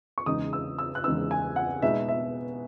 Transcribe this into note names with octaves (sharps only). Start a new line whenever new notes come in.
C#6
E2 C#3 G#3 D#4 D#6
E6
E6
F#6
E2 C#3 G#3 D#4 E6
G#5
F#5
B2 G#3 B3 D#4 E5
E5